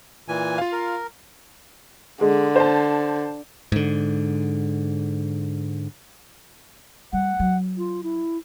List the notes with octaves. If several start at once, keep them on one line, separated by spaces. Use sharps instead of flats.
A#2 E3 G#5
F4 F5
A#4
D3 G#3
C5 A5
G#2 D3
G3 F#5
F#3
F4
E4